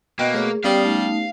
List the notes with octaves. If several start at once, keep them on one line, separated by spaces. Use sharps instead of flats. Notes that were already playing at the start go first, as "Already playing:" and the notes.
B2 A#3 D#5 G5
A3 G#4 A#4 C#5
G3 B3 C#4 G4 D5 F5 G5 D#6
A3 D#4